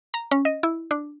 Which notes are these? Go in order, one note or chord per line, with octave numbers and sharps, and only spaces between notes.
A#5
C#4
D#5
E4
D4